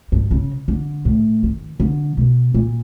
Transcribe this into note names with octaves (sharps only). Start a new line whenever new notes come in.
G2
C#3
D3
A2
D#3
D3
B2
A#2